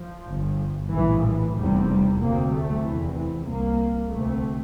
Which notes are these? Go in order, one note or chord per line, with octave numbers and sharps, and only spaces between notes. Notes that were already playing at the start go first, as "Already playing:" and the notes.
Already playing: F3
G1 G2
A#1 A2 E3
E3
F1 E2 C3 G3
G3
D2 C3 A#3
A3
F1 E2 C3 E3
E3
C2 C3 A#3
D2 C3 A3